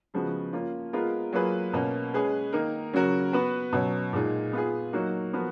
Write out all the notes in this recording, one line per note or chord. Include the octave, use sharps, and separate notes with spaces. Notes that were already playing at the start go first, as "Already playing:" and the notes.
C#3 F3 G#3 B3 F#4
A#3 C#4 F4
G#3 B3 F4 A#4
F#3 A#3 F4 G#4 B4
B2 A#3 C#4
G#3 C#4 G#4 B4
D#3 A#3 D#4 A#4
C#3 F#3 C#4 F#4 A#4
B3 F#4 B4
B2 F#3 C#4
A#2 G#3 D#4
B3 F4 G#4
F#3 A#3 D#4 F#4
F3 B3 F#4 A#4